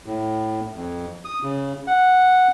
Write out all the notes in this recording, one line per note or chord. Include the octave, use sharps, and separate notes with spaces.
A2
F2
D#6
C#3
F#5